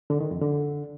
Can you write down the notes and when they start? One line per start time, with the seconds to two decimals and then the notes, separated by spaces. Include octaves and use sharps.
0.10 D3
0.21 D#3
0.31 F2
0.42 D3